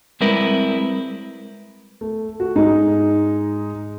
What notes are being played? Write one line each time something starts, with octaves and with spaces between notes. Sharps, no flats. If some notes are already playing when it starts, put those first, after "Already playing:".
G3 G#3 C4 E4 A#4 B4
A3
F#4
G#2 G#3 D#4